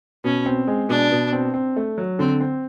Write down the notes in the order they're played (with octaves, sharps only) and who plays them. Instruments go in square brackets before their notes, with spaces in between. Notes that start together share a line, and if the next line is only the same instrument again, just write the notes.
[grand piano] B2 [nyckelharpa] C#4
[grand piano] C4
G#3
[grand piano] B2 [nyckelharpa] D4
[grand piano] B2
C4
C4
A3
F#3
[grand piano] D3 [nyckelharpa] C4
[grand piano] C4